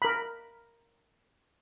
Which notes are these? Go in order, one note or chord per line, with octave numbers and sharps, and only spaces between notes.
A#4 B5